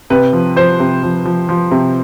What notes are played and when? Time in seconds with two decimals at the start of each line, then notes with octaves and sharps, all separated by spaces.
0.10 C3 B4
0.33 F3
0.56 F3 C5
0.80 C3
1.03 F3
1.25 F3
1.49 F3
1.71 C3